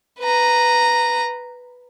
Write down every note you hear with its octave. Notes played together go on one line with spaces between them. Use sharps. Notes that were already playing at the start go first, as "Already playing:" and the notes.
B4 A#5